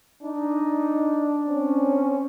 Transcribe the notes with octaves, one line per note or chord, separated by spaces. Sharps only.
D4 D#4
C4 C#4